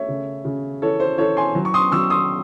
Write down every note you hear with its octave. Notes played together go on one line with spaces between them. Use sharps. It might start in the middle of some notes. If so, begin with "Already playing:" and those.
Already playing: A3 C#5 E5
C#3
C#3
E3 A4 C#5
C5
E3 A4 C#5
G#5 C6
F#3
C#6
C6 D#6
F#3 C#6 E6
C6 D#6